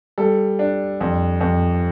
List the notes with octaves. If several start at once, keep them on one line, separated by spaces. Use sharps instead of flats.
G3 A4
D4
F2
F2